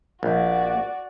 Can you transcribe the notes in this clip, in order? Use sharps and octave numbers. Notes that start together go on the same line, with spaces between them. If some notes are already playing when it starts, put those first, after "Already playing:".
A#1 F#4 D5